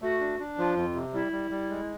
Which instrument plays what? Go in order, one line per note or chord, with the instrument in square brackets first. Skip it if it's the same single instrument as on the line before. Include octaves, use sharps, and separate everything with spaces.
[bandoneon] A3 [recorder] F#4
[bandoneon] D4
D4
[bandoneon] F3 [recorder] F4
[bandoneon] F2
C3
[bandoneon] G3 [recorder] E4
[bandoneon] G3
G3
G#3